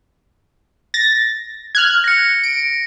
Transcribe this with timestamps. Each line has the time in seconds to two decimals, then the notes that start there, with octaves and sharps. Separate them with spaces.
0.94 A6 A#6
1.75 F6 F#6 G#6
2.04 A#6 C#7
2.44 D7